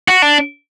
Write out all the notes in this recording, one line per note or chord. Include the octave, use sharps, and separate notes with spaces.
F#4
D4